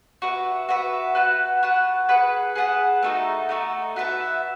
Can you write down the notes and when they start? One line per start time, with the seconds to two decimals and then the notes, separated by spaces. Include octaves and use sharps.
0.22 F#4 B4 E5
0.69 F#4 B4 E5
1.15 F#4 B4 F#5 A5
1.63 F#4 B4 F#5 A5
2.09 G#4 B4 F#5 A5
2.56 G#4 B4 F#5 A5
3.03 A3 D#4 F#4 A4
3.49 A3 D#4 F#4 A4
3.96 F#4 B4 E5 A5